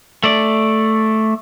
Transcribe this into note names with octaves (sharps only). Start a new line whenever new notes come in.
A3 D5